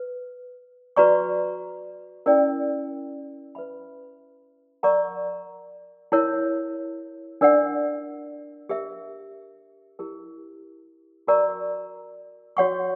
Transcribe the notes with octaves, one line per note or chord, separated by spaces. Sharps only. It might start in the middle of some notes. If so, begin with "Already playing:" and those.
Already playing: B4
F#4 B4 D5 A#5 C#6
C#4 E4 A#4 D5 G5
B4 E5 B5
A#4 D5 F#5 A#5 C#6
E4 A#4 C#5
D4 A#4 D5 F#5
G4 A#4 E5
E4 G4 A#4
F#4 A#4 D5 A#5 C#6
F#4 C#5 F#5 C#6